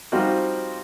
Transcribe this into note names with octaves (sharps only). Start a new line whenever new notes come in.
F3 G3 C4 D#4 F4 F#4